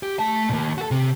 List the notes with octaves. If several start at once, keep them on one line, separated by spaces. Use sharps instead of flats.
G4
A3 A5
D#2 A#2
F#4 A4
C3